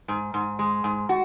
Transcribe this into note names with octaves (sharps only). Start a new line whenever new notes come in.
G#2
G#2
G#3
G#2
F#4